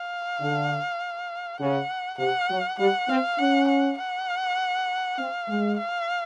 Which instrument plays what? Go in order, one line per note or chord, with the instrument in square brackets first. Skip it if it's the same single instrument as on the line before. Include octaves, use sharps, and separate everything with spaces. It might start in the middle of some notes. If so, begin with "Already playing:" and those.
Already playing: [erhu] F5
[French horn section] D3
[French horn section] C#3 [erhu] F#5
[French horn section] C3 [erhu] F#5
[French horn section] F#3
[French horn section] G3 [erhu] F#5
[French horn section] C4 [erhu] F5
[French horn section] C#4 [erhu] F#5
[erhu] F#5
F#5
[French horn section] C4 [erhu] F5
[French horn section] G#3
[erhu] F5